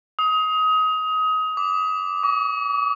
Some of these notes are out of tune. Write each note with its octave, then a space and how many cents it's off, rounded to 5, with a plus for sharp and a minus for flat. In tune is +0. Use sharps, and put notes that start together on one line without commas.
D#6 +25
D6 -10
D6 -45